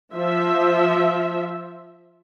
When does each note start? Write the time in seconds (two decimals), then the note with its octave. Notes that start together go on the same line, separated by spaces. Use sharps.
0.14 F3 E5